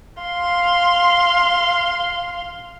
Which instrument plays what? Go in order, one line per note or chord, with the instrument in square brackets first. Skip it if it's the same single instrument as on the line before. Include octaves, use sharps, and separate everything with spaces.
[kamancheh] F5 C6